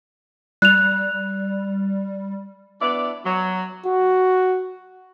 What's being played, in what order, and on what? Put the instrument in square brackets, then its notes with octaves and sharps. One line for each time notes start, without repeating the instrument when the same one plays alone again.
[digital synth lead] G3 [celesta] F#6 F7
[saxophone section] B3 D4 E4 D5
F#3
[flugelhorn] F#4